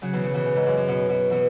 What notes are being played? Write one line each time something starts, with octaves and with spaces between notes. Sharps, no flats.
C#3 F#3
B2 E3
C#3
B2 E3
C#3
G#2
F#2
F#2
B2
B2
B2 E3